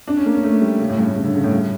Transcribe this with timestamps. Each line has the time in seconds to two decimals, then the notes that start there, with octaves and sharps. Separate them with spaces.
0.08 D4
0.17 C#4
0.26 A#3
0.35 C#4
0.43 A3
0.61 G3
0.79 C#3
0.89 A2
0.98 G2
1.07 A2
1.16 C#3
1.24 D3
1.34 C#3
1.44 A2
1.52 G2